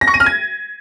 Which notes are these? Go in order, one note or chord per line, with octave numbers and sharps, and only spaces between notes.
A#6
C#6
D#7
F6
G#6